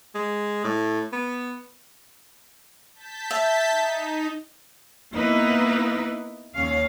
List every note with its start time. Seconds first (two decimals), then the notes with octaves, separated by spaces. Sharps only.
0.15 G#3
0.64 A2
1.13 B3
2.95 A5 G6 B6
3.31 E5
3.71 D#4
5.12 A#3 B3 D#4 E4 B4
6.55 D#2 C#4 F5